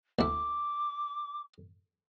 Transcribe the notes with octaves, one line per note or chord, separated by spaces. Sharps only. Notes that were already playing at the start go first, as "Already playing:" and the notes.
D2 E4 D6